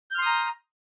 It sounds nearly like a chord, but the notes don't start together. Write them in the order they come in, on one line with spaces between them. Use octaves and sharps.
G6 F6 C6 D#6 A#5